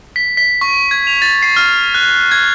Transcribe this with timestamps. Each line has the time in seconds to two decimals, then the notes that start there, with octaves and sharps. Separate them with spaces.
0.16 B6
0.37 B6
0.61 C#6
0.91 G#6
1.07 F7
1.22 A6
1.42 C7
1.56 F6
1.94 F#6
2.31 G#6